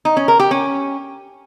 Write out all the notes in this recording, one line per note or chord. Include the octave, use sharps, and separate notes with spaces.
D#4
C#4
A#4
G4
C#4